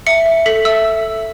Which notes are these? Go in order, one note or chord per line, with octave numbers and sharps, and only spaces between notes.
E5 C#7
E5
A4 B6
E5 E6